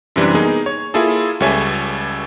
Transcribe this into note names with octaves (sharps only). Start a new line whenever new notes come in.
F#2 C3 E3 G3 D4
A#3 B3 D#4 G#4
C#5
A#3 E4 F4 G#4 A4
C#2 G3 A4 C#5 E5 G#5